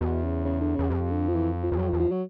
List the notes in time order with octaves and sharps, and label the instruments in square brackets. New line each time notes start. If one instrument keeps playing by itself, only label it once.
[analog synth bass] E2 [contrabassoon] B2
[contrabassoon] C#3
C#3
D3
[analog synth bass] E2 [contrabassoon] C#3
[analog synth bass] F2 [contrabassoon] C3
[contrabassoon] D3
F3
E3
F3
[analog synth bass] E2
[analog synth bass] F2 [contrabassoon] F#3
[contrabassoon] F3
[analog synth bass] E2
[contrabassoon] F3
F#3